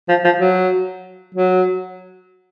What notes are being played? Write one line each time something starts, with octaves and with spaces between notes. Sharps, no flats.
F3
F3
F#3
F#3